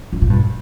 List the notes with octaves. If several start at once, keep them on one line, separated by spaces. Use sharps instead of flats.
G2
A#2
G2